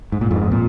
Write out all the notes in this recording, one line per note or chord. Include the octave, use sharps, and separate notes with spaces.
G#2
A#2
F2 G#2
A#2